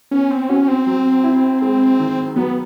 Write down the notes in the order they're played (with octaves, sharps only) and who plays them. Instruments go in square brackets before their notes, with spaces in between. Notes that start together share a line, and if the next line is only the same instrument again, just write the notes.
[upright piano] B3 [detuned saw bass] C#4
[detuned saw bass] C4
[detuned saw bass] C#4 [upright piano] F#4
[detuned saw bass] C4
[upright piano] F#3
E4
G#3
D#3
[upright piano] F#3 [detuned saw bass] B3